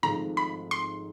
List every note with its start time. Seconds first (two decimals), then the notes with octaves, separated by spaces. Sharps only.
0.03 G#1 G#2 F3 A3 C4 A#5
0.37 B5
0.71 C6